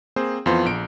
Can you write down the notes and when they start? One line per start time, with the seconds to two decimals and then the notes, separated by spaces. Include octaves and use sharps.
0.16 A#3 C4 G#4 C5
0.46 F2 E3 B3 F4 C5 C6
0.65 A#1 D7